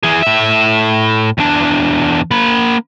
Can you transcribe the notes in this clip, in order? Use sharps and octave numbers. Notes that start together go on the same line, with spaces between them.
E3 G#4
A2 E5
E2 D4
A#3 B5